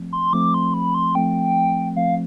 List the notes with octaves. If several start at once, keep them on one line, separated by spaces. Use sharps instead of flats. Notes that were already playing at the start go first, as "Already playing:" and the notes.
Already playing: F3 A3 C4
C6
F3 A3 C4 D6
C6
B5
C6
F3 A3 C4 G5
F3 A3 C4 F5